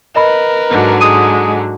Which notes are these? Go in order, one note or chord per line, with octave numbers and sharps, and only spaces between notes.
A#4 B4 D#5 B5
G#2 D3 F#3
G#3 D#6 D#7